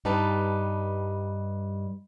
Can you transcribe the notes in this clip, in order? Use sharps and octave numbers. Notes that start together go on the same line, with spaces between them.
G2 G3 D#4 B4 A5